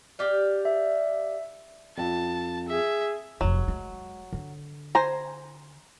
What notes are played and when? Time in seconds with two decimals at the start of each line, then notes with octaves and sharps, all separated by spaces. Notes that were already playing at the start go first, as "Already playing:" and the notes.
0.19 G4 D5 F5
0.65 E5
1.97 F2 A5
2.68 G#4 E5
3.41 F1 F2 F#3
3.68 G#3
4.33 D3
4.95 C5 G#5 A#5